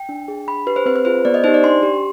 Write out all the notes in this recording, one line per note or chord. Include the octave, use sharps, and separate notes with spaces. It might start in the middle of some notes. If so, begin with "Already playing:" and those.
Already playing: G5
D4
G#4
D4 B5
G4 B4
C5
C4 B4
B4
F4 G#4 C5
B3 D5
D#5
D#4 G4 C5
D5
D4 C6
G4